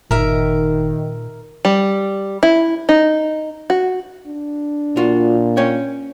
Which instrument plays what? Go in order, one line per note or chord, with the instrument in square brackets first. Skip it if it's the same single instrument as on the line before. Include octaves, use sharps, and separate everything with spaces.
[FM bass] G1 [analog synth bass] A#2 [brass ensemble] D#3 [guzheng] A#4 E5
[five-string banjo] G3
E4
D#4
F#4
[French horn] D4
[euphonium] A#2 [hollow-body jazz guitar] F4 F#4
[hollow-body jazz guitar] C#4 C#5 G5